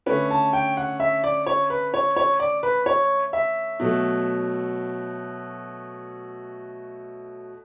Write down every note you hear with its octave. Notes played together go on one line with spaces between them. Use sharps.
D3 A3 C#4 B4
A5
G5
F#5
E5
D5
C#5
B4
C#5
C#5
D5
B4
C#5
E5
B2 F#3 A3